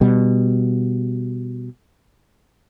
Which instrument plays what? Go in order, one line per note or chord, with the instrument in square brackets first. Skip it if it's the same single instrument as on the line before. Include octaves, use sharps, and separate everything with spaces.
[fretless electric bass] B2 G3